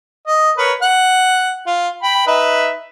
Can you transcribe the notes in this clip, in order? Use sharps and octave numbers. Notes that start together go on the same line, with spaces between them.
D#5
A#4 B4 C#5
F#5
F4
G5 B5
D#4 B4 E5